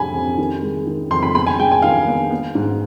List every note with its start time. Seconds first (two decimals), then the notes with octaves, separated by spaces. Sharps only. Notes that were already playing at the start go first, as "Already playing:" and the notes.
Already playing: F2 C3 G3 G#5 B5
0.14 F2
0.38 D#3
0.63 G#3
0.87 D#3
1.11 F2 C6
1.23 B5
1.34 B3 B5
1.47 G#5
1.59 G#3 G5
1.72 G#5
1.82 D#3 F5
2.07 B3
2.31 B3
2.55 G#2